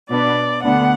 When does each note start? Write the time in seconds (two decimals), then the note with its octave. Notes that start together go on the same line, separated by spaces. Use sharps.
0.10 B2 B3 D4 D5
0.63 D2 D3 B3 D4 F#5